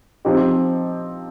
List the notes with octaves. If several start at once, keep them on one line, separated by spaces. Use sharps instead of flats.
F3 C4 D#4 G4